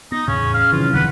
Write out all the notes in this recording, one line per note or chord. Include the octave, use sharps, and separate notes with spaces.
B3 D#4 A#6
E2 A2 C#3 C#4
F5
C3 D#3 E3 F#3 F4
D1 F2 D#3 B4 F#5